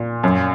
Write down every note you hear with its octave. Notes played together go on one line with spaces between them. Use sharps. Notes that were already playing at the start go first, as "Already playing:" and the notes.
Already playing: A#2
F#2